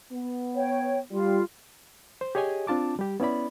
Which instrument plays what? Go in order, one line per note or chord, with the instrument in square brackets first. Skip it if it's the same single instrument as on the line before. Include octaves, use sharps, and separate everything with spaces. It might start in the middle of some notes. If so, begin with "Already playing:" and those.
[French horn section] B3
[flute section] C#5 G5
[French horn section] G3 [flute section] F4
[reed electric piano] C5
G4 G#4 C#5 D#5 G#5
C4 D4 F4 A5 D6
G3 G4
B3 C#4 E4 D5 B5